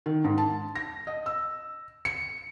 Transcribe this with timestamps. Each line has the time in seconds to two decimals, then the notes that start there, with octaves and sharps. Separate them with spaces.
0.06 D#3
0.24 G#2
0.38 A5
0.75 A#6
1.07 D#5
1.26 E6
2.05 C#7